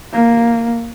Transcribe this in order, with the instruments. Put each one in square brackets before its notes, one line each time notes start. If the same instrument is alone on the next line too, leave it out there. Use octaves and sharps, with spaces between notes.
[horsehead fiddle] A#3